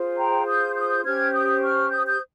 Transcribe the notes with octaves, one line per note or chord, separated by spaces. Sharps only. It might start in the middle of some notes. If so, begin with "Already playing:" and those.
Already playing: F4 G#4 C5
G5 A#5
D#6 G6
D#6 G6
C#4 G4 C5 F6 G#6
D#6 G6
C#6 F6
D#6 G6
D#6 G6